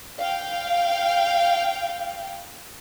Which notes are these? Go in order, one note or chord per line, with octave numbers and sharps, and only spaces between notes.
F5 G5